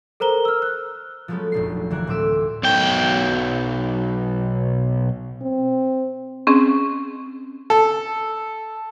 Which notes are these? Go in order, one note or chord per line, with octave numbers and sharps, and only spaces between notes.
A4 A#4 C5 A#5 G7
E6 F6
F#6
F3 F#3 G#3 A3 B3 C#4
F1 A#1 C7
D2 E3 A#4 F#6 G#6
A2 C4 C6 D6 E6 B6
B1 G5
C4
C4 C#4 G#4
A4